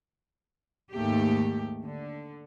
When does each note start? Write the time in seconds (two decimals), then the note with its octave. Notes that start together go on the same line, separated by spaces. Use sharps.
0.93 D#2 G#2 A3 G4
1.84 D3